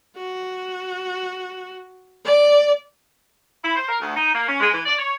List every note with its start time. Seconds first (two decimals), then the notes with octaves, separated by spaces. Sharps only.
0.17 F#4
2.25 D5
3.63 E4
3.76 C5
3.88 A#4
4.01 D2
4.16 D#4
4.34 A#3
4.48 C#4
4.59 G#3
4.73 E3
4.85 D5
4.98 C#5